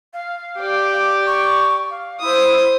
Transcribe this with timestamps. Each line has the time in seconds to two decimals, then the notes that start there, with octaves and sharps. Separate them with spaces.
0.14 F5
0.60 G4 D5
1.27 C#6
1.90 F5
2.21 E4 C5 D#6